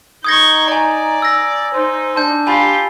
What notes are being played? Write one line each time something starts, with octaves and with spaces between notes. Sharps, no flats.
D#4 C#6 D#6 G6 G#6 A#6
D5 G#5 A#5
E6 A#6
D#4 C5
D4 A5 G6
F4 G4 G#5 B5